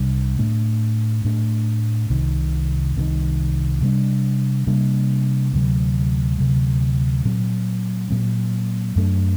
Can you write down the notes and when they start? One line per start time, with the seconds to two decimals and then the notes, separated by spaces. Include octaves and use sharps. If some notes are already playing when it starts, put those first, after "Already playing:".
Already playing: C2 C3 G3 D4
0.39 A2 A3 D4
1.25 A2 A3 D4
2.10 C2 C3 D#3
2.96 C2 C3 D#3
3.82 C3 G3 A#3 D4
4.67 C3 G3 A#3 D4
5.53 D2 C3 F#3
6.38 D2 C3 F#3
7.25 A#2 F#3 C4
8.10 A#2 F#3 C4
8.96 F#2 F#3 A3 D4